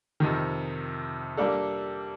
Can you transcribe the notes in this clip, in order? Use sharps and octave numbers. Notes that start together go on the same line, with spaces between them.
F2 C3 D#3
G3 A#3 D4 A4